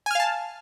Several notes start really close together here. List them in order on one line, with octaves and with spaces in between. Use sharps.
G#5 F6 F5 A5